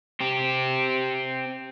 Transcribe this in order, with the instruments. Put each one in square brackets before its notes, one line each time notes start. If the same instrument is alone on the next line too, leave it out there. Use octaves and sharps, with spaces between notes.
[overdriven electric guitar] C4 G4